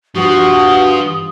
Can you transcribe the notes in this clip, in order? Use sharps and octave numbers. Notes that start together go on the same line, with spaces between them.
G2 F3 F#4 D#6